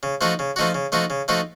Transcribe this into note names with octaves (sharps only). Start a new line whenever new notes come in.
C#3
F3 A3 D#4 F#4
C#3
F3 A3 D#4 F#4
C#3
F3 A3 D#4 F#4
C#3
F3 A3 D#4 F#4